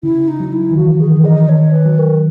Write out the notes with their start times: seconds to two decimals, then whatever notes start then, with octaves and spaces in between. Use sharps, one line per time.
0.03 C#3 E4
0.28 D#4
0.40 F#3
0.52 E4
0.71 D#3
0.76 E3 F#4
1.00 G#4
1.08 D#3
1.13 E3
1.25 D#5
1.49 D#3 C#5
1.73 B4
1.85 F#3
1.98 A#4